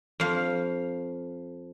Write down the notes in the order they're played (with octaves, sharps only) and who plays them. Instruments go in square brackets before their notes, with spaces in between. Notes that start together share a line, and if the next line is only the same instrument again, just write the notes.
[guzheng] F2 F5